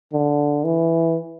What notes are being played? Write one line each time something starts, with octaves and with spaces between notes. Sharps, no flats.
D3
E3